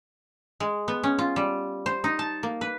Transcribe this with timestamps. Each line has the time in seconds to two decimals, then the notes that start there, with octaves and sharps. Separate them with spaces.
0.60 G#3
0.88 B3
1.03 C#4
1.19 F4
1.36 G3
1.86 C5
2.04 D#4
2.19 A5
2.43 A#3
2.61 B4